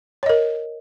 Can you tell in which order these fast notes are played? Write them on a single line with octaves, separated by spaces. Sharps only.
C#5 D#5 A#4